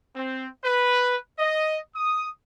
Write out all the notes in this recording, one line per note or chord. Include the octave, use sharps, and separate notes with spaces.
C4
B4
D#5
D#6